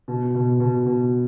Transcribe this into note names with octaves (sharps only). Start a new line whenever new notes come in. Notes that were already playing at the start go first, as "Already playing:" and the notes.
B2
B2
B2
B2